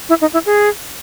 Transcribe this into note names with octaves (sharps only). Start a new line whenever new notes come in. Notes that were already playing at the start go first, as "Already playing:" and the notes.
E4
D#4
E4
G#4